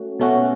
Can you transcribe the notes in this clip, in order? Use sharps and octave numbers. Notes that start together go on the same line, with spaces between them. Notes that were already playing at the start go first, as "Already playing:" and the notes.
Already playing: A3 C#4 F#4
B2 A3 C#4 F#4